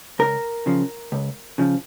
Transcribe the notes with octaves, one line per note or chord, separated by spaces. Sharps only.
C#2 A#4
C#3 F3
C#2
C#3 F3